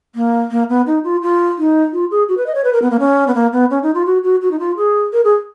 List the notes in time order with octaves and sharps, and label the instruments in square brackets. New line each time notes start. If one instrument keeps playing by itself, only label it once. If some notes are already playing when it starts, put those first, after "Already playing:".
[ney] A#3
A#3
B3
D#4
F4
F4
D#4
F4
G#4
F#4
B4
D#5
C#5
B4
A#4
B3
A#3
C#4
B3
A#3
B3
C#4
D#4
F4
F#4
F#4
F#4
D#4
F4
G#4
A#4
G#4